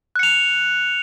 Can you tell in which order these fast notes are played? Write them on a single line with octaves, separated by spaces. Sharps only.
F#6 C#7 F7